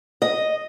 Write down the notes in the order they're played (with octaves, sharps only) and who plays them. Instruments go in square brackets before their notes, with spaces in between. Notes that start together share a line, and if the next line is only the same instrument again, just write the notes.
[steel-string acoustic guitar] D#5